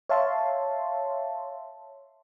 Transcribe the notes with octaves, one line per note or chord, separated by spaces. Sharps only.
C#5 E5 F5 A5 C6